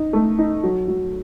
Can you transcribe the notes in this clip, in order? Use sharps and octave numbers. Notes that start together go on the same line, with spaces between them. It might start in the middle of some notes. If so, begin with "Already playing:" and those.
Already playing: D#4
A3
D#4
F#3
F#3